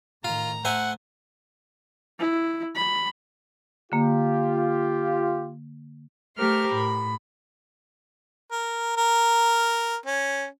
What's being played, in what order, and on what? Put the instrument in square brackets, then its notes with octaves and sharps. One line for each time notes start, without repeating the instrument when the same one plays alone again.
[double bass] A2 D#3 [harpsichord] F4 [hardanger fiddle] A#5
[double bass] A3 [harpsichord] C5 E5 G#5 [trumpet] F#5
[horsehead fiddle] E4
B5
[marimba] D3 A#3 [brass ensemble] F4 G4
[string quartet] A3 G4 A#4 C5 F6
A2 B5
[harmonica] A#4
A#4
C#4